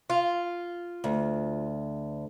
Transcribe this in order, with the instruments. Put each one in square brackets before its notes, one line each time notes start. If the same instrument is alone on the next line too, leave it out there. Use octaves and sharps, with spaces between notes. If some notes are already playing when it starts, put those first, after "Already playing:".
[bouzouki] F4
[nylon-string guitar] D2